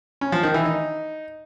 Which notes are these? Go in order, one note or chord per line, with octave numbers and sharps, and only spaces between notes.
C#4
F3
D#3
E3
D#4